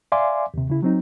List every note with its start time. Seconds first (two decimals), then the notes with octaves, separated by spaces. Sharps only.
0.12 D5 E5 F5 G#5 C6 D6
0.54 D#2 C3
0.70 C#3 E4
0.82 F#3 C4 D#4